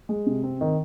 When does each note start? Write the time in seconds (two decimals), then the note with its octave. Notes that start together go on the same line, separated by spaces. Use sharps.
0.09 G#3
0.26 C3
0.44 C4
0.61 D#3